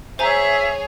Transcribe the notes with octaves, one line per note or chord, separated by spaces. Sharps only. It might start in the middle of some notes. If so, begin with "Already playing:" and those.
G#4 C5 C#5 E5 G#5 A#5